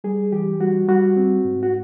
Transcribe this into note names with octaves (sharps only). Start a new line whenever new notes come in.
G3 G#4
E3 G4
G3 F#4
G3 F#4
C4
G#2
F#4